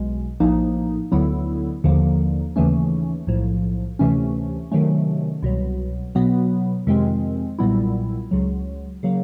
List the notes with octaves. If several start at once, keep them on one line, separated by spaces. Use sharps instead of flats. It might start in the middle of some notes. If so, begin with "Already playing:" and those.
Already playing: B1 B2 G#3
A#1 A2 F3 A#3 D#4
D2 D3 F#3 B3 E4
D#2 D3 F3 A#3
D#2 C#3 E3 A3 C#4
B1 A2 F3
D2 C3 E3 A3 C#4
C3 D#3 F#3 A3 C#4
C2 B2 F#3
B2 F#3 B3
F2 C3 D#3 G#3 C4
B1 A#2 G3 B3 E4
C#2 C#3 F#3
C#3 F#3 A#3